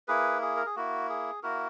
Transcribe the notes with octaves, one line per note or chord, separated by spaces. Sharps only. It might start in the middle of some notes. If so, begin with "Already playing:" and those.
A#3 E4 G#4 B4
G#4
A#4
G#4
A#3 E4 F#4
G#4
A#3 E4 F#4 A#4